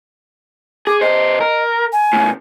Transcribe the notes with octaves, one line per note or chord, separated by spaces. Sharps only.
G#4 D6
B2 C5 D#5
A#4
G#5
A2 C#3